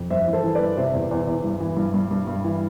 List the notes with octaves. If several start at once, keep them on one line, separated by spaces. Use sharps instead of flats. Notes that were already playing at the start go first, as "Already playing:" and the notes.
Already playing: F2
G2 C5 E5
E3
A4 C5
E3
B4 D5
G2
C3 C5 E5
E2
E2
E2
G2
E3
G2
G2
G2
G2
E3